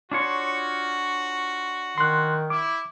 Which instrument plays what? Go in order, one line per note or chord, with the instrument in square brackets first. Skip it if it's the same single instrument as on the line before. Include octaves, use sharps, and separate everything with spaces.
[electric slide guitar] D4 F4 C#5 [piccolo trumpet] F#4
[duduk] D#3 [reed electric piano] C6 F#6
[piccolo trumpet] E4 [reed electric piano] D6